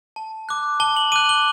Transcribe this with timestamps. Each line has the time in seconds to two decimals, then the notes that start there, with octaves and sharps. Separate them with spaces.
0.16 A5
0.49 D6 F#6
0.80 A5 G7
0.96 F#7
1.12 D6 F#6 D#7
1.29 G7